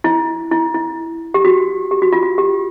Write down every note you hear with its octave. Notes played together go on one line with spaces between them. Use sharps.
E4
E4
E4
G4
F#4
G4
F#4
F4
F#4
G4